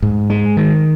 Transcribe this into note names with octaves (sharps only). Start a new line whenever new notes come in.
G#2
G#3
D#3